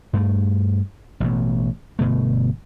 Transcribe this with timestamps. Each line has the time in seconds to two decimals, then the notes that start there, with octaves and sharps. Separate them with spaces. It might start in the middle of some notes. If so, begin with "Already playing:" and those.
0.13 G2 A3
1.20 A1 B2
1.99 G1 B2 A3